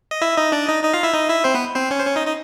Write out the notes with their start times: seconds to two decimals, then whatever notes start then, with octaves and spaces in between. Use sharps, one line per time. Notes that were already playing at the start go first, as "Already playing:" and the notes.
0.11 D#5
0.22 E4 E5
0.37 D#4 D#5
0.52 D4 D5
0.67 D#4 D#5
0.83 D#4 D#5
0.93 F4 F5
1.03 E4 E5
1.14 D#4 D#5
1.29 E4 E5
1.44 C4 C5
1.54 B3 B4
1.75 C4 C5
1.91 C#4 C#5
1.99 C5
2.05 C#4 C#5
2.16 D#4 D#5
2.27 D#4 D#5